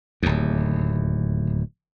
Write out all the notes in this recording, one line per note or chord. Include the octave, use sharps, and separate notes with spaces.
D1 D#2